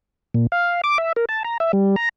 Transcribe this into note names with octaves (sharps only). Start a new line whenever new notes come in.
A#2
F5
D6
E5
A#4
A5
A#5
E5
G3
A#5